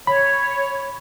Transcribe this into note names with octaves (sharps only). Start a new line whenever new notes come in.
C#5 B5